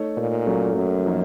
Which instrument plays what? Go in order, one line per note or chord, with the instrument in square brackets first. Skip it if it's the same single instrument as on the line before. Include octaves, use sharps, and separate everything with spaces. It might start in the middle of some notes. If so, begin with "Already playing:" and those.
Already playing: [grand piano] A3 D#4 A4 C#5
[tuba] A#2
[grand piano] F#3 A3 C#4 F#4
[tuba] F#2
[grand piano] F3 A#3 D#4